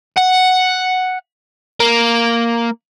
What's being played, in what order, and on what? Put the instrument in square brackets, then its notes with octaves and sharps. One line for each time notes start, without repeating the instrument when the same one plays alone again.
[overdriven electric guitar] F#5
A#3